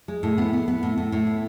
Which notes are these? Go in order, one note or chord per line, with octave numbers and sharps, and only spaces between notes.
G#3
A2
B3
B3
B3
A2
A2
A2
B3